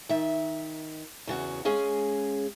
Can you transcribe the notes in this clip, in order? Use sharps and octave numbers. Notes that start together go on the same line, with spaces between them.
D#3 E5
E2 C#3 F#4
G#3 C#4 G#4 F5